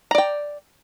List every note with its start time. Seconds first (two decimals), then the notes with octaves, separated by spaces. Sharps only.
0.11 A#5
0.15 D5
0.18 G5